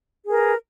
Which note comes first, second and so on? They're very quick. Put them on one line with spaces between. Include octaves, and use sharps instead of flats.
G#4 A#4 B4